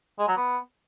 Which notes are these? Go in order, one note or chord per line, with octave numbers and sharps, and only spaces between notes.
G#3
F#3
B3